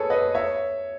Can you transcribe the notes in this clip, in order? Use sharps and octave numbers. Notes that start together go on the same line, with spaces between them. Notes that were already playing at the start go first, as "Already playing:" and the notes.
Already playing: G#4 A4 B4 C#5
B4 D#5
C#5 E5